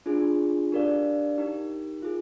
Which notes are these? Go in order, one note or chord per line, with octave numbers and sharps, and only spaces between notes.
D4 F4 G#4
D4 G4 A#4 D5 F5
D#4 G4 A#4
F4 G#4